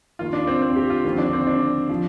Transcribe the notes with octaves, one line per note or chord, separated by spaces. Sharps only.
D#2 D#3 F4
D4
C4
C4
G4
F4
D#2 D3 F3 C4
D4
C4
D4
F3